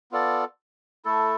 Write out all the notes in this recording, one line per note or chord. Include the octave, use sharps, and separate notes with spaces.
B3 F4 A4 D5
A3 E4 A4